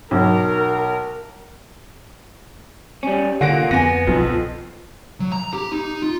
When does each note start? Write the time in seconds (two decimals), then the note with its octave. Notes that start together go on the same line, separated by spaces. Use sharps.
0.11 B1 A#4
3.03 G3 C#4
3.41 D3 A#3 F4 F#5 A#6 D7
3.71 F2 B3 G#5 A#6
4.07 B1 F2
5.20 F#3
5.32 A#5
5.53 G4
5.72 D#4
6.02 F4